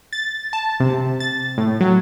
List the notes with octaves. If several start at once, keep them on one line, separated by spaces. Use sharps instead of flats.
A6
A5
C3
A6
A2
F#3